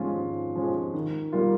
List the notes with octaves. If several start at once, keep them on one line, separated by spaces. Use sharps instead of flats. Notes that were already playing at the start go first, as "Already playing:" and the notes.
Already playing: G#2 F3 G#3 C#4 F4
G#2
F3 G#3 C#4 F4
D#3
G3 A#3 F4